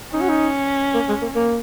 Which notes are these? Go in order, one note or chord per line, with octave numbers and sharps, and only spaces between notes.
C#4 D#4
F#4
D#4
A#3
G#3
A#3
A#3